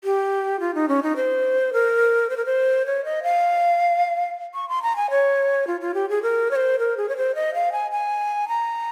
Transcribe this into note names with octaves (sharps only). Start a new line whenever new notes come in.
G4
F4
D#4
C#4
D#4
C5
A#4
C5
A#4
C5
C#5
D#5
F5
C#6
C6
A#5
G#5
C#5
F4
F4
G4
G#4
A#4
C#5
C5
A#4
G#4
C#5
C5
D#5
F5
G#5
G#5
A#5